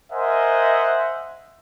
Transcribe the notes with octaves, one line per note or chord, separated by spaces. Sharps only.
A#4 C5 D#5 E5 F#5 G#5